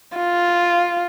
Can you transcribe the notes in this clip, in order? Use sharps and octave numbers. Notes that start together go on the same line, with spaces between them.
F4